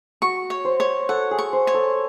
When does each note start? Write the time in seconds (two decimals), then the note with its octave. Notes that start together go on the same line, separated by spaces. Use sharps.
0.22 F#4 C#6
0.50 C#5
0.65 C5
0.80 C#5
1.09 A4 F#5
1.31 G#4
1.39 C#6
1.53 C5
1.67 C#5
1.74 A4